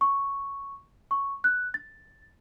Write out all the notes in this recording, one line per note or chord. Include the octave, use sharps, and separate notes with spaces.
C#6
C#6
F#6
A6